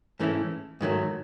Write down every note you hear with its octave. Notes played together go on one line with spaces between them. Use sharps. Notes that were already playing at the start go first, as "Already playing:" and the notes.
G#2 E3 A3 C#4 E4
G#2 D#3 F#3 A3